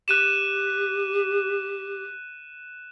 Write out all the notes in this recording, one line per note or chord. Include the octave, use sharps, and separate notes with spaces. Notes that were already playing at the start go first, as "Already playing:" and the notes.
G4 F#6 D#7 E7